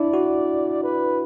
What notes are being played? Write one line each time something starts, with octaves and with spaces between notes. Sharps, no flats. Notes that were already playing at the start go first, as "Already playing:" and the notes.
Already playing: D4 E4 D5
F#4
B4